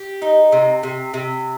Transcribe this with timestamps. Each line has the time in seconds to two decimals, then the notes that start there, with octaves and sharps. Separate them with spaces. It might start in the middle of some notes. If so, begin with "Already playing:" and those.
Already playing: G4
0.22 D#4
0.52 C3
0.83 C3
1.14 C3